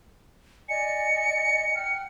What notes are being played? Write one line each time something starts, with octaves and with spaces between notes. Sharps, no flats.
D5 D#5 G#5 C#7
F#5 G5 F6